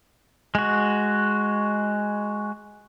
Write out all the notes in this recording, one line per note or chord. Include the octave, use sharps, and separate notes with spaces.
G#3 F#4